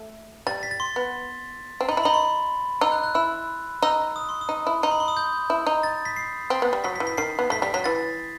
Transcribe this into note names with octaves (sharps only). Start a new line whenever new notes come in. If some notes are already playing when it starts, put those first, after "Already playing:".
Already playing: A3
G3 A6
B6
A6
C6
B3
C4
D#4
B5
E4
D#4 B5
C6
D#4 E6
F#6
F#6
E4 E6
D#4 E6
D#6
C6
D#6
D#4
E4
D#4 C6
B5
C6
D#6
G6
E4
D#4
A6
B6
C7
C4
B3
G3
F#3 B6
B6
E3
B6
D#3 C7
B3
A3 B6
G3 B6
F#3 B6
E3 A6